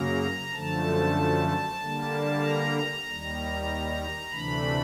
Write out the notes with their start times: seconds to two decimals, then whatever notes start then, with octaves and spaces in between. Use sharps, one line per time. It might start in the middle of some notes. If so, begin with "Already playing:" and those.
Already playing: F#2 C#3 F#3 A#3 A#5
0.52 F#2 D3 F3 A3 A5
1.79 D3 G3 A#3
2.42 A#5
3.05 D#2 D#3 G3
4.31 D2 C3 E3 A3 D4 B5